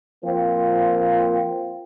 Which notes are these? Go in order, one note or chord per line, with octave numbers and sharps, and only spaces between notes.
F3 A#3 C4 F4